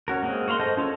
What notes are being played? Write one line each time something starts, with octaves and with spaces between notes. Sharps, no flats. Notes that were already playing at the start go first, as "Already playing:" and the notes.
C#4 F#4 A#4
G#3 A#3 C4 G#4
F#4 A#4 F5 B5 C6
A4 C5 D#5
C#4 F4 A4 A#4 C#5